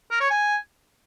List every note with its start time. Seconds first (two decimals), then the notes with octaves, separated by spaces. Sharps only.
0.11 A#4
0.20 C#5
0.30 G#5